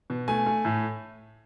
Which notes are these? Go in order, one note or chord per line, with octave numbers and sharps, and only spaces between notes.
B2
A3 G#5
A3
A2